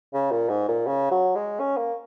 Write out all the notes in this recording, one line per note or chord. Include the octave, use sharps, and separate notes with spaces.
C#3
A#2
G#2
A#2
C#3
F#3
G#3
C#4
A#3